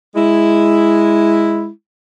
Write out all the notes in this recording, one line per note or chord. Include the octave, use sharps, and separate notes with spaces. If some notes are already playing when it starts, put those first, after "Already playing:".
G#3 E4